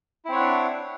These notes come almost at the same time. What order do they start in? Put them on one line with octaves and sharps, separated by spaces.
E4 C4 C#5 F#5 D4